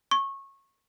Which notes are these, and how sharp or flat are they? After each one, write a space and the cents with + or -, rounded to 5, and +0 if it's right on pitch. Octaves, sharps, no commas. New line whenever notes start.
C#6 -20